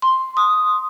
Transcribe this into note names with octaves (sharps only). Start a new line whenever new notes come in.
C6
D#6